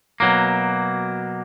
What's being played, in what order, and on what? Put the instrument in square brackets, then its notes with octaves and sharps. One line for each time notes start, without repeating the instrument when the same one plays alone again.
[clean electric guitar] B2 F#3 A#3